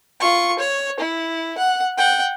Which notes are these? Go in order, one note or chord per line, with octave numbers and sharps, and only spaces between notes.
F4 C#6
C#5
E4
F#5
F#5 G5